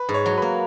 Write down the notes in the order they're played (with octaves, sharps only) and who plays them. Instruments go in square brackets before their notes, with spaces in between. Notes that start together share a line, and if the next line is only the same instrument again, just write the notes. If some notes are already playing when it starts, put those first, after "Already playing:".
Already playing: [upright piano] B4
[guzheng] G#2
[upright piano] C#5
[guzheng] F#3
[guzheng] A#3 [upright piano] B4